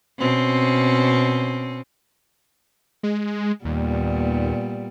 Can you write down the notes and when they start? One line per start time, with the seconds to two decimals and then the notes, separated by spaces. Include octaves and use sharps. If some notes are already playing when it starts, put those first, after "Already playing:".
0.19 B2 C4 C#4
3.03 G#3
3.65 D#2 A#2 G3 B3